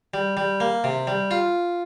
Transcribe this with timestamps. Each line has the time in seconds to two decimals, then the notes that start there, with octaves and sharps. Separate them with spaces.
0.14 G3
0.37 G3
0.60 A#3
0.84 C3
1.07 G3
1.31 F4